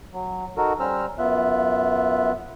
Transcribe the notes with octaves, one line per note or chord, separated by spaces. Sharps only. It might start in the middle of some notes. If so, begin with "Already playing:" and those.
F#3
D#4 F#4 A4 A#4
G3 C#4 C5 A#5 E6 F6
F#2 B3 F4 E5 F#6